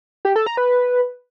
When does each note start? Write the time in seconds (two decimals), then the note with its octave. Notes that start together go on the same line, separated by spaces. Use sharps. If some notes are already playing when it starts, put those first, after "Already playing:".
0.25 G4
0.36 A4
0.47 A#5
0.57 B4